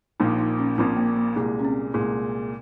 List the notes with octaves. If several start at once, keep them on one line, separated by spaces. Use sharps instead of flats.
A#1 A#2 F3 D#4
D#4
C#4
A#1 A#2 F3 C4
A#3
A#3
C2 A#2 G#3
C#4
C4
C2 A#2 G#3